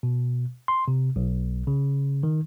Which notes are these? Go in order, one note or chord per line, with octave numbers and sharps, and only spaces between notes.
B2
C6
C3
B1
C#3
D#3